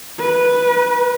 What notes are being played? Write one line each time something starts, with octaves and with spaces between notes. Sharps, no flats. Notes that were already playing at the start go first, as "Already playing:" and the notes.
B4